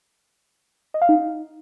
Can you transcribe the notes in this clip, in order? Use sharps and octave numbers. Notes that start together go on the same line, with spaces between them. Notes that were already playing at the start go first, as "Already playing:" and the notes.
D#5
F5
D#4